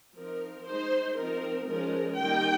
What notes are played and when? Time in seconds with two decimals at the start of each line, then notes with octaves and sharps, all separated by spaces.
0.15 F3 C4 D#4 A#4
0.66 G#3 D#4 C5
1.17 F3 C4 D#4 A#4
1.67 F3 G#3 C#4 A#4
2.17 D#3 G3 A#3 D#4 G5